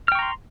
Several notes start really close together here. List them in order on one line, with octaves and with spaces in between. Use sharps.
F6 G5 C#6 A#5 C6